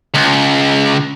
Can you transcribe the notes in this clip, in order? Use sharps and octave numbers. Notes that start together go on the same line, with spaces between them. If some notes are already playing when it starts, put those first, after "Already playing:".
C#2